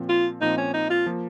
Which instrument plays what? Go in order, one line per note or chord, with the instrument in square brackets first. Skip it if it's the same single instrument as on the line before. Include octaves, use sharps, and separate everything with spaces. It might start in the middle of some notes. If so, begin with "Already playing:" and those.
Already playing: [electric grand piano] A#2 F3 C4
[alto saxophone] F4
[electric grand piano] A#2 F3 C4 [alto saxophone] D#4
[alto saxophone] C#4
D#4
F4
[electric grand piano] F3 A#3